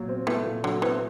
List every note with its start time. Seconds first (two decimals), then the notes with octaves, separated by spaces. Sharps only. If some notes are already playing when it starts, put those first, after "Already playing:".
Already playing: A#2 F#3
0.08 C4
0.27 E3 A3
0.45 A#2
0.63 D3 F#3
0.82 E3 C4